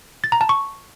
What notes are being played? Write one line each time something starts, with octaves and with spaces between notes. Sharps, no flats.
A6
A#5
A5
C#6